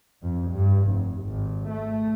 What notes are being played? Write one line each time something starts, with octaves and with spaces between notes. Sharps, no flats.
F2
G2
F1
G#1
A3